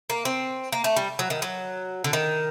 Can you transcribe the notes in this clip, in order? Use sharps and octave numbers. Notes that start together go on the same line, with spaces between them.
A#3
C4
A#3
A3
G3
F#3
D#3
F#3
D3
D#3